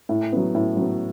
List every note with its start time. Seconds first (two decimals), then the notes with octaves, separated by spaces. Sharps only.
0.09 A2
0.32 F#3 B3
0.55 A2
0.77 F#3 B3